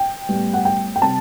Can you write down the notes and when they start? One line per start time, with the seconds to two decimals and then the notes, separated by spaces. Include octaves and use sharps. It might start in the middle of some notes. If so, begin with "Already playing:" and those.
Already playing: G5
0.29 A2 G3 B3
0.54 F#5
0.65 G5
0.96 G5
1.02 C3 G3 C4 A5